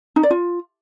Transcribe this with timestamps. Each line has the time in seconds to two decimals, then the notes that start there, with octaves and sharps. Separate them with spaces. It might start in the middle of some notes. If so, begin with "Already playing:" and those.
0.16 D#4
0.23 D5
0.31 F4